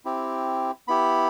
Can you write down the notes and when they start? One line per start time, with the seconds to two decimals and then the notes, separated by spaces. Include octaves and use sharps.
0.05 C4 E4 G4
0.88 B3 E4 G4 B5